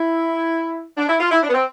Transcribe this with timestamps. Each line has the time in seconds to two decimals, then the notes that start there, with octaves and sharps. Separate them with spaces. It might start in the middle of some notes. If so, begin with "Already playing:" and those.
Already playing: E4
0.97 D4
1.08 E4
1.20 F4
1.31 E4
1.43 D4
1.49 B3
1.54 C4